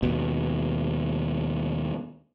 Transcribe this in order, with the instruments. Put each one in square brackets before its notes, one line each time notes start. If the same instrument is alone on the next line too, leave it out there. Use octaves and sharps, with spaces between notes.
[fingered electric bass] D#2 B2